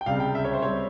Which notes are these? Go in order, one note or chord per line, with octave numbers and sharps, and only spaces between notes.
G5
C#2 C3 G3 F5
G5
E5
C#5
C5
G3 C4 C#5